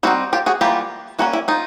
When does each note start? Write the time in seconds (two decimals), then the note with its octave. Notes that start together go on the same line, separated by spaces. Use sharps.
0.03 G3 C4 D#4 E4 F#4
0.33 F4 G4
0.46 F#4 G#4
0.61 E3 G3 A#3 F4 G4
1.19 G3 A#3 C#4 E4 F#4
1.33 E4
1.48 D#4 F4